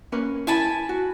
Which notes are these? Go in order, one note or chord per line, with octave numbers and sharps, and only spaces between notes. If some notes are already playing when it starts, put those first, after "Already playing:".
A#3 C#4 B4
E4 G#5 A5 B5
F#4